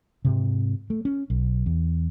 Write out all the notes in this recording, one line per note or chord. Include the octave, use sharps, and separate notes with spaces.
G#2 C3
A3
C#4
B1
E2